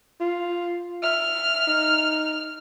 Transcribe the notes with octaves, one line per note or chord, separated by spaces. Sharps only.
F4
E5 F6
D#4